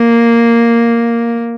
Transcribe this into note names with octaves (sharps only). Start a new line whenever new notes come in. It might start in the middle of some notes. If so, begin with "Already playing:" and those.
Already playing: A#3